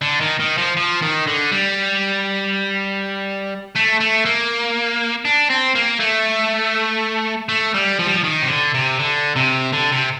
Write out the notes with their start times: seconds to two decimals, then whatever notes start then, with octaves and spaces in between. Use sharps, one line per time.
0.02 D3
0.21 D#3
0.40 D#3
0.58 F3
0.77 F3
1.02 D#3
1.27 D3
1.51 G3
3.76 A3
4.01 A3
4.25 A#3
5.25 D4
5.50 C4
5.75 A#3
6.00 A3
7.49 A3
7.74 G3
7.99 F3
8.07 G3
8.14 F3
8.24 D#3
8.43 C3
8.49 D3
8.74 C3
8.99 D3
9.36 C3
9.73 D3
9.92 C3